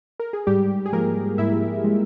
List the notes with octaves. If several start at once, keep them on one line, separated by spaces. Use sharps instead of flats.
A#4
G#4
G#2 G3 G4
G#4
F3 G#3 A#3 A#4
G#2 E4 E5
F3 G#3